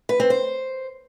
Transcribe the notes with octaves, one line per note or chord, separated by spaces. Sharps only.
B4
C4
C5